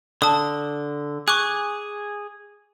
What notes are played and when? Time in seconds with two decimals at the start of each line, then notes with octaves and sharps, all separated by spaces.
0.22 D3 A5 D#6
1.28 G#4 C#6 D6 F#6